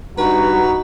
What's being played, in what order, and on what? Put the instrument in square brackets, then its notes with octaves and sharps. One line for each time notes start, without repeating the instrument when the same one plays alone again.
[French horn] G2 [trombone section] D#4 F#4 [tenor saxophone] B4 [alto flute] A#5